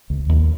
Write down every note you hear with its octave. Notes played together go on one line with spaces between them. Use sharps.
C#2
D#2